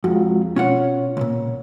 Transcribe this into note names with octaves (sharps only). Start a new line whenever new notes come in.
F2 G#3 F4 F#4
B2 C#4 F4 C#5 F#5
C#2 A#2